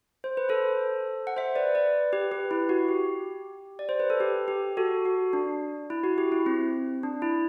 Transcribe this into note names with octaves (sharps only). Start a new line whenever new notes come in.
C5
B4
A4 C5
F#5
C5 E5
B4 D5
B4 D5
G4 B4
G4 B4
E4
F#4
G4
D5
C5
B4
A4
G4
G4
F#4 A4
F#4
D4
E4
F#4
G4
E4
C4
D4
E4